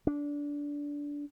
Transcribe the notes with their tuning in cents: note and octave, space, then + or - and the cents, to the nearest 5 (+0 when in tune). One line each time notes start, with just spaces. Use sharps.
D4 -20